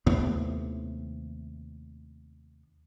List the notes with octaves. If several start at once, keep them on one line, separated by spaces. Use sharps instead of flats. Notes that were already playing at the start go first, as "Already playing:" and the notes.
D#2 A2 C3 B3